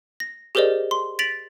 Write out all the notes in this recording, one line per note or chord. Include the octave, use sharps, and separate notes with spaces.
A#6
G4 G#4 A#4 C5 D5 D#5
C6
A6 B6 D7 F7 F#7